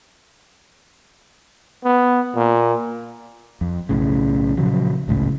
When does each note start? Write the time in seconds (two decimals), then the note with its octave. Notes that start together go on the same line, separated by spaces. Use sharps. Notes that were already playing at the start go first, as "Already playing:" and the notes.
1.84 B3
2.36 A#2
3.61 F2
3.89 B1 A2 C#3
4.58 A#2 C#3 F3 F#3
5.08 G#1 C#2 A2 C#3